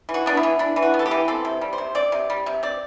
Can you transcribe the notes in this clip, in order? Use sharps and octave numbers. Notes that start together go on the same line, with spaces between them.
E3
F#4
B3 D4
E4
E3
D4 E4
E3
F#4
B3
A4
G4
E3
C4 A4
C3
G3
C5
C3
C4 D5
C3
G3
C3
C4 D5